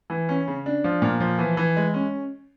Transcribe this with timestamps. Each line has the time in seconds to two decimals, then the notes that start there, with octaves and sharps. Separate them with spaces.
0.10 E3
0.29 C#4
0.48 C#3
0.66 D4
0.84 F3
1.02 A#2
1.20 F3
1.38 E3
1.57 E3
1.76 G#3
1.94 C#4